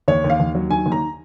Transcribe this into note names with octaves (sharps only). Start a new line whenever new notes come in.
D#2 C#5
D#2
F5
D#2
F#3
D#3 G#5
D#2
A#5